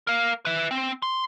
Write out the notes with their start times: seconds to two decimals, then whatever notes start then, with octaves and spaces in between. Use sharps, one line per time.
0.07 A#4 F5
0.45 B4 E5
0.71 C4
1.02 C6